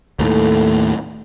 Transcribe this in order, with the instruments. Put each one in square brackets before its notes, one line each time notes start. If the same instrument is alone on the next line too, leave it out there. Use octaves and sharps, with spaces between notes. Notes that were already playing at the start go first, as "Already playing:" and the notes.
[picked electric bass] D#2 A2 [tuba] A3